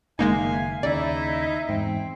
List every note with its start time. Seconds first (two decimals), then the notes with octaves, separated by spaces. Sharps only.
0.19 F#1 D#3 G#3 A#3 D#4 E5 F5 G#5
0.83 D#2 C#3 D#4 E4 D5 E5
1.69 E2 G#2 C4